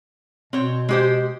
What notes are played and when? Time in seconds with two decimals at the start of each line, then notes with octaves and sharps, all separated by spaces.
0.53 B2 C4 C#5
0.89 G#3 G4 C5